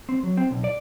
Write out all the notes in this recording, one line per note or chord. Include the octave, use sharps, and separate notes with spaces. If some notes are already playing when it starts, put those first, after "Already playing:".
C4
F#3
C4
B1
D5